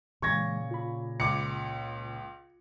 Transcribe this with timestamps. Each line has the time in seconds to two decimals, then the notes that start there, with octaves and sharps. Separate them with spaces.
0.22 A#2 C#3 E3 G#3 C#6 G#6 A#6
0.71 F4 B5
1.20 C#2 D6 C#7